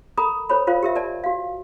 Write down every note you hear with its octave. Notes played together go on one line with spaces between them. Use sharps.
A4 A#4 A#5 B5 D#6
A4 A#4 C5 C#5 B5
F4 A#4 C5 F5
G4 A#4 E5
A#4 D5 A5
F#4 F5